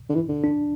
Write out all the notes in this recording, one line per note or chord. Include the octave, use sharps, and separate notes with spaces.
D3
E3
D3
D4